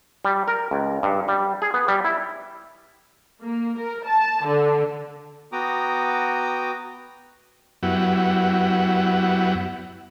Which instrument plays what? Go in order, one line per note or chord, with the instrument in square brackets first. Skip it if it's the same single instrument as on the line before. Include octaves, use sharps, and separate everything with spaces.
[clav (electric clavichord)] G3
A#4
C#2
G2
G3
G#4
B3
G3
E4
[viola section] A#3
A#4
A5
D3
[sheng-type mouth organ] B3 F#4 G5 A#5 D6 D#6
[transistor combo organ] F#2 F#3 B3 E4 G4 F#5